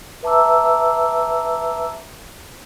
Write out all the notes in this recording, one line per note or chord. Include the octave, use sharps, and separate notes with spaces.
B4 E5 A5 A#5 D6 E6